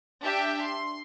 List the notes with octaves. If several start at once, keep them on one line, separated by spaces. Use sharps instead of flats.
D4 G4 E5 G5
C6